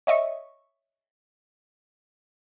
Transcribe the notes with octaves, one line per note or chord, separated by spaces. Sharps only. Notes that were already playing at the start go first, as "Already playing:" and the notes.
C#5 D#5 E5 C#6